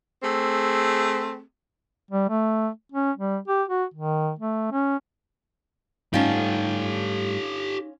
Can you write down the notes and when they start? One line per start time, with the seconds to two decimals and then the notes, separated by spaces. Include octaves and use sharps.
0.23 A3 C4 G#4
2.11 G3
2.30 A3
2.92 C#4
3.17 G3
3.48 G4
3.68 F#4
3.94 D#3
4.39 A3
4.72 C#4
6.14 G#2 G3 A3 C#4 D#4 F4 G4 A4